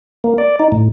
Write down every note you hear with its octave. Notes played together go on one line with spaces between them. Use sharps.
A#3
D5
D#4
A2